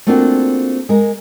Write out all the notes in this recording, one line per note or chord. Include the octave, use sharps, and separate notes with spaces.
A3 A#3 C4 D4 F4 F#4
G#3 A#4